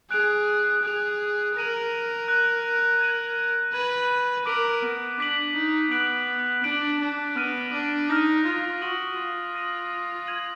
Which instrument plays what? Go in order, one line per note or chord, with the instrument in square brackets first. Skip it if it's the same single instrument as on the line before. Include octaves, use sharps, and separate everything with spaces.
[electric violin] G#4 [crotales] F#6 D7 F7
[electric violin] G#4 [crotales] F#6 D7 F7
[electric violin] A#4 [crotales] F#6 A#6 D#7 F#7
[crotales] F#6 A#6 D#7 F#7
G#6 D#7 F#7
[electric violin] B4 [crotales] G#6 D#7 F#7
[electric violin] A#4 [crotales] D6 F#6 B6 D7 F#7
[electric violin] B3
[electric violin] D4 [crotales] D6 F#6 B6 D7 F#7
[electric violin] D#4
[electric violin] B3 [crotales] F#6 D7 F#7
[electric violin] D4 [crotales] F#6 D7 F#7
[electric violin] D4
[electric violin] B3 [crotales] F6 A#6 D#7
[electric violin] D4
[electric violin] D#4 [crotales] F6 A#6 D#7
[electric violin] F4
[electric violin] F#4 [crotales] D#6 A#6 D#7 F#7
[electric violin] F4
[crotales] D#6 A#6 D#7 F#7
F6 G#6 D#7 F#7